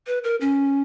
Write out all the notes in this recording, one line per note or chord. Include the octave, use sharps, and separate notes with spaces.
B4
A#4
C#4